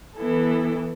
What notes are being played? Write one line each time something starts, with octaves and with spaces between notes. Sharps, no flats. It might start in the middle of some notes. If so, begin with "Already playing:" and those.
E3 B3 E4 A4